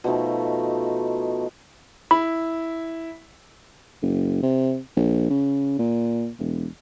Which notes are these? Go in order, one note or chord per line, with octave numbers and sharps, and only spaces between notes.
B2 F3 A3 D#4
E4 B5
F#1
C3
A#1
C#3
A#2
E1